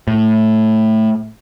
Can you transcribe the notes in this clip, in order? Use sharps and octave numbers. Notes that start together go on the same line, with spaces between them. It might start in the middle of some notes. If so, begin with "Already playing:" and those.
A2